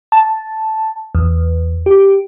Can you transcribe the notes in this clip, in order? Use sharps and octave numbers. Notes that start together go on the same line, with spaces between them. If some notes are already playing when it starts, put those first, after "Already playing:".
A5
E2
G4